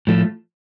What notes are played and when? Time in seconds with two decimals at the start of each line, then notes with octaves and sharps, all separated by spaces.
0.07 A2 F3 A3